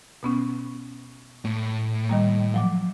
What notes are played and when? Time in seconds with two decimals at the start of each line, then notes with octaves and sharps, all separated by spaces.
0.23 B2 B3 C#4
1.45 A2
2.09 D#3 G3 A#3
2.54 F3 F#3 D6